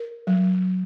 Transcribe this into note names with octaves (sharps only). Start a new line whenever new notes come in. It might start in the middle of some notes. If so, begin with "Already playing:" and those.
Already playing: A#4
F#3